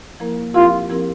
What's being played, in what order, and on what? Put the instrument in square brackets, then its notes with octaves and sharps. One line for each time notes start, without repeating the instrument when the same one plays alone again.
[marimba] F3 A#3 E4 A#4
[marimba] F3 C4 E4 G4 A#4 [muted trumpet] F4
[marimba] F3 C4 E4 G4 A#4